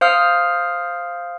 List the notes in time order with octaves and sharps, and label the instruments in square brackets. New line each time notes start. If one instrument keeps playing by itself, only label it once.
[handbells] C5 F5 D#6 F6